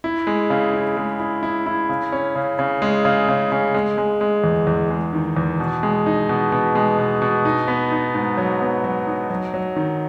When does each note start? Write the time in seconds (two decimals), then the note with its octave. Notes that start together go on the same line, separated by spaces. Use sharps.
0.04 E4
0.27 G#3
0.50 C#3
0.74 E4
0.97 G#3
1.20 E4
1.43 E4
1.66 E4
1.89 C#3
2.12 C#4
2.35 C#3
2.59 C#3
2.82 G#3
3.05 C#3
3.28 C#3
3.52 C#3
3.74 G#3
3.98 G#3
4.21 G#3
4.44 E2
4.67 E2
4.90 G#3
5.13 D#3
5.37 E2
5.60 B2
5.83 G#3
6.06 D#4
6.29 B2
6.52 B2
6.75 G#3
6.98 B2
7.22 B2
7.45 D#4
7.68 B3
7.91 D#4
8.15 G#2
8.37 F#3
8.61 B3
8.84 F#3
9.07 D#4
9.30 F#3
9.54 F#3
9.76 D#3